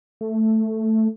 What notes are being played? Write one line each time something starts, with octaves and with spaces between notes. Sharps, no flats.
A3